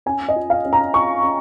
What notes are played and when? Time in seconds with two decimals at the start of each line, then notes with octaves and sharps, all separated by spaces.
0.06 C#4 G#5
0.29 D#5
0.36 F4
0.50 F5
0.65 C#4
0.73 A#5
0.94 F4 C#6
1.23 C#4